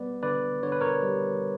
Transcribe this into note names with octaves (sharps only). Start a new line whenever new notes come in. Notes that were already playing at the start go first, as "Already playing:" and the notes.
Already playing: G3 B3 B4 D5
D3 B4 D5
D3 C#5
B4
A#4 C#5
G3